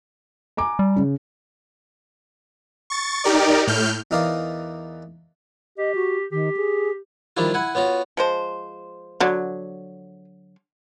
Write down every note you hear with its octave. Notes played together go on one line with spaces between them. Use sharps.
G#5 A#5 D6
G3
C#3
C#6 A6
D#4 G4 A#4 D5
A2 F6 G6
E2 E3 D#4 A#4 D5 F5
G4 D#5
F#4
D#3 G4
G#4
D#3 F3 G3 D4 E4 F4
E4 F#5 G#5
B3 C#4 F4 F#4
F3 G#3 C5
D3 F#3